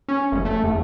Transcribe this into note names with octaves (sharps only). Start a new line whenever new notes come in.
C#4
F1
A3
E2